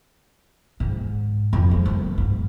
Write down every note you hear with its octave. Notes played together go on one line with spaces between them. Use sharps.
G#2
F2
G#3
F#1
G#2